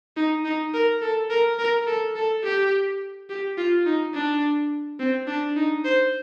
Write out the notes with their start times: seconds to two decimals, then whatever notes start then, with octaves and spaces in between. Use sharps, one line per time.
0.17 D#4
0.45 D#4
0.74 A#4
1.02 A4
1.30 A#4
1.59 A#4
1.87 A4
2.16 A4
2.44 G4
3.29 G4
3.57 F4
3.86 D#4
4.14 D4
4.99 C4
5.27 D4
5.56 D#4
5.85 C5